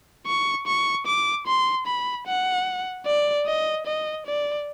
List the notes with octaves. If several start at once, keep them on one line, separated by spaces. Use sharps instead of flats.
C#6
C#6
D6
C6
B5
F#5
D5
D#5
D#5
D5